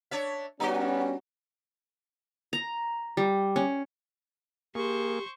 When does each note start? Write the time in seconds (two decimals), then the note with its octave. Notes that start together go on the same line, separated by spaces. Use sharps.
0.11 D4 C#5 E5
0.60 G3 B3 C#4 D4 F#4
2.53 A#5
3.17 G3
3.56 C#4
4.75 A#3 G4 G#4 C5 C#6